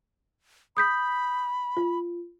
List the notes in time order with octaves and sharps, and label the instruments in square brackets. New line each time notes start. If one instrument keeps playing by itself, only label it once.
[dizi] B5 [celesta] D#6 G6 B6
[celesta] F4